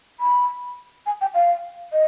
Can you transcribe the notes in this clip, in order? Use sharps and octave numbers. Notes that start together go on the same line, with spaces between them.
B5
G#5
G5
F5
D#5